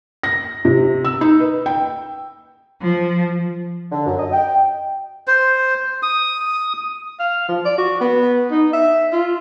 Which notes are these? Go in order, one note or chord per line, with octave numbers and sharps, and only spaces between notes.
A#6
C3
E6
D#4
B4
G5
F3
D3
F#2
D#5
G5
C5
D#6
F5
F3
D5
F#4
B3
D#4
E5
F4